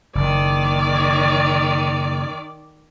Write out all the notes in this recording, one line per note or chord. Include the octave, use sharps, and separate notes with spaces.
F#1 D#3 D5